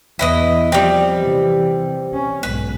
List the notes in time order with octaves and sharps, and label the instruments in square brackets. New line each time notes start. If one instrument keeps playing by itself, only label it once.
[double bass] E2 [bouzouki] E4 B4 D#5
[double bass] F3 [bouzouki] G3 C4
[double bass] C3 E3
C#4
[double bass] B1 G#2 [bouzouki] B4